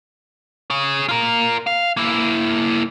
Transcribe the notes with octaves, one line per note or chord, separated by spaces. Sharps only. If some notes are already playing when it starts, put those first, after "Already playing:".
G#4 C#5
F4 A#4
F5
A#3 E4